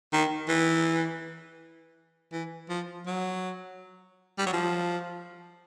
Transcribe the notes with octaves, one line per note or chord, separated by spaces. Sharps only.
D#3
E3
E3
F3
F#3
G3
F#3
F3